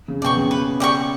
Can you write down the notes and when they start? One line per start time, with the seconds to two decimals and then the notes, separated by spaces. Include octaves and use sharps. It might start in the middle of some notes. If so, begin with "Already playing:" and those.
0.08 C#3
0.22 B2 D5 G5 C#6
0.37 C#3
0.51 B4
0.80 D5 G5 C#6